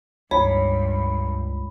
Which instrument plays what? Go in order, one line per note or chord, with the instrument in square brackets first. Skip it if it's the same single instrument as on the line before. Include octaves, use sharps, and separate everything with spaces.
[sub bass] C#2 [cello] G2 [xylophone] C#5 [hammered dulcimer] B5